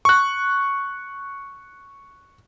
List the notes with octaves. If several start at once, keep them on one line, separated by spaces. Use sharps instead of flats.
C#6 F#6